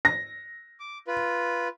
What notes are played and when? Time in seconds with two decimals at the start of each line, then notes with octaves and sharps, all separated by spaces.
0.05 A#6
0.80 D6
1.07 F4 B4